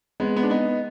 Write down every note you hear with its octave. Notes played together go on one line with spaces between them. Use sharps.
G#3 B3
B3
D4
B3 D#4